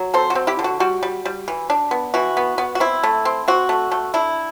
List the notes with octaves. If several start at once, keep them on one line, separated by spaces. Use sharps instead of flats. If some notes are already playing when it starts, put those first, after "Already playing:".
Already playing: F#3
C4 A4 C5
F#4
C4
E4 G4
D3
F#4
G3 F#4
G3
G3
E3
D4
B3
E3 F#4
B3
B3
F#4
C4 E4
A3
C4
C4 F#4
A3
A3
D4 E4